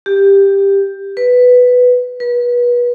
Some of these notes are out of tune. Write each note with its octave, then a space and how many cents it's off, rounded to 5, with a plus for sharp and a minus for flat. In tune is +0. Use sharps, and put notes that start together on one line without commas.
G4 +10
B4 +5
B4 -30